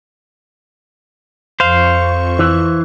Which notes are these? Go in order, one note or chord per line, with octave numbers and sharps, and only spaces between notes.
F2 C5 F5 C#6
E3